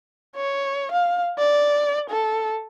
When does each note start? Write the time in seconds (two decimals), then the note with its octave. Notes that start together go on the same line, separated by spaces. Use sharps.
0.36 C#5
0.92 F5
1.38 D5
2.10 A4